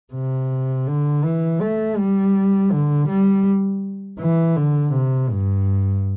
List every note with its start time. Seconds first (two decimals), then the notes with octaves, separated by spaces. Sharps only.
0.13 C3
0.87 D3
1.24 E3
1.61 A3
1.98 G3
2.71 D3
3.08 G3
4.19 E3
4.56 D3
4.93 C3
5.30 G2